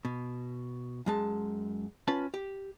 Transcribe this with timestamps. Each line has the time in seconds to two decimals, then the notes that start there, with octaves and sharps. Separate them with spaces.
0.05 B2
1.06 F#2 G#3 A5
2.08 C#4 F4 B4 A5
2.34 G4